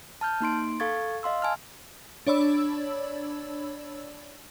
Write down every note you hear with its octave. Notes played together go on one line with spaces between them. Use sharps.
A5 F6 G6
A#3 D#4 C6 D7
A4 F5 C#6 G#6 A6
D#5 F5 C6 E6
G#5 A5 F6
D4 C#5 D5 B5 E6